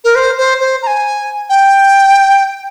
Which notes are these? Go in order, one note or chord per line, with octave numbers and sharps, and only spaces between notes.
A#4
C5
C5
C5
A#5
G#5
G5